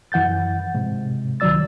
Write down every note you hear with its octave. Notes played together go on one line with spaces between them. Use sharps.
F#2 E3 F#5 G6 A6
G#2 C3
C#2 D#3 F#3 D5 E6 A6